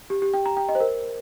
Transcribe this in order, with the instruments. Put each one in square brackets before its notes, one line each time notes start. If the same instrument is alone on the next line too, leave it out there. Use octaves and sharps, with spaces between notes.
[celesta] G4
G4
G5
A#5
G5
D#5
C5
A#4